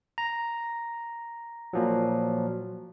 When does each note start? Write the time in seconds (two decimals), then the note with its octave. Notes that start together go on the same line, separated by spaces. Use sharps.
0.18 A#5
1.73 A#2 F3 F#3